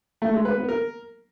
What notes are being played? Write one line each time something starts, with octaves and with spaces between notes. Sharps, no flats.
A3
G#3
B4
B3
A#4